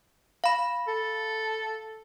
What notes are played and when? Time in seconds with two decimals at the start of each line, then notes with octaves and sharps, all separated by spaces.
0.44 F5 B5
0.88 A4